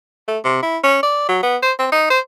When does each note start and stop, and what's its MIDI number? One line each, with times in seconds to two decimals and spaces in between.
0.28 0.38 57
0.44 0.62 48
0.63 0.78 64
0.83 1.01 61
1.03 1.26 74
1.29 1.40 54
1.43 1.57 59
1.63 1.73 72
1.79 1.88 60
1.92 2.07 63
2.10 2.20 72